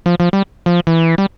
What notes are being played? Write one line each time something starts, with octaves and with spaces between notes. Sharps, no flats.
F3
F3
G3
F3
E3
G3